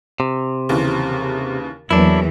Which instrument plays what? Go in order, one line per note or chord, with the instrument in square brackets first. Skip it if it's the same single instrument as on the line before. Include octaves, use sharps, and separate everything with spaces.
[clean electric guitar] C3
[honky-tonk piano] D#2 C#3 E3
[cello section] E2 E3 [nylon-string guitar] F#3 A#3 [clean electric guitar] D4 E4